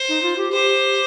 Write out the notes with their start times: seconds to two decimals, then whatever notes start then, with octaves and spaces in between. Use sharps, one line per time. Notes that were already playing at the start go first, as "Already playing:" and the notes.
Already playing: C5
0.09 D#4
0.23 F4
0.38 G4
0.52 G4 C5